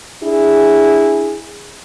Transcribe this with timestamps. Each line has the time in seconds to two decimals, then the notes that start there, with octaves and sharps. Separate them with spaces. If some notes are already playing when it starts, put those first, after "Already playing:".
0.24 D4 E4 G#4